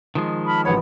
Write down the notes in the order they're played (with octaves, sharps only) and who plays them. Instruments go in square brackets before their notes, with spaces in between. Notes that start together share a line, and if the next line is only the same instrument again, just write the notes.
[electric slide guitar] D#3 F3 G#3
[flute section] A5 B5 F6
[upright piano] A1 B4 B5 [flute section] C#5 F#5